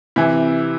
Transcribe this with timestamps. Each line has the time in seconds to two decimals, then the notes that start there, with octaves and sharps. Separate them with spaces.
0.16 C3 E3 E4